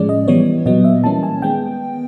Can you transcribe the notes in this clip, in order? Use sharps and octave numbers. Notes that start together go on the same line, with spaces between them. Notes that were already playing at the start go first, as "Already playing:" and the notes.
Already playing: A2 F3 G#3 C#4 D5
D#5
E3 G3 B3 C#5
A#2 F#3 B3 D#5
E5
E3 G3 A#3 C#4 A5
G#5
D#3 G#3 B3 G5